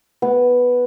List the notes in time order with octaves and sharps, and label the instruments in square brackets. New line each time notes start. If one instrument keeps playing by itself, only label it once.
[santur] B3